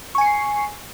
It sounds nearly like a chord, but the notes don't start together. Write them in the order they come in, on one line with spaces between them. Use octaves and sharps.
C#6 G#5 C#7 C7